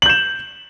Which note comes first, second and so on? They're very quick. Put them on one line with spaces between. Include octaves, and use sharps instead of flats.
F#7 G6 E7